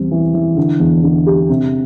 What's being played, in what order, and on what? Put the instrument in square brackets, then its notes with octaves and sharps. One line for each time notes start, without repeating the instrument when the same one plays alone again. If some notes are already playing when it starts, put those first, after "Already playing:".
Already playing: [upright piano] E2 G3 C4
E3
E3
D3
E2
D3
G4
C3